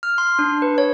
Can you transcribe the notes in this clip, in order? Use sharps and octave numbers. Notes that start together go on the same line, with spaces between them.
F6
C6
D4
B4
C#5